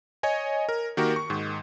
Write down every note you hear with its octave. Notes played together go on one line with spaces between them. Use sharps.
C#5 D#5 G#5
A#4
D#3 A#3 F#4 G4 A#4
C#6
G#2 D#3